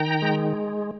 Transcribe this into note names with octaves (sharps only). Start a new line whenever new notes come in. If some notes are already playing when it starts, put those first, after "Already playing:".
Already playing: D#3 G5 A#5
G#3